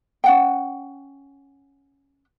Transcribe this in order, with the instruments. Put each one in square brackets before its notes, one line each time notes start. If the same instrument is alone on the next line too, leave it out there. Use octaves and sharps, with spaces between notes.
[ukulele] C#4 F#5 G5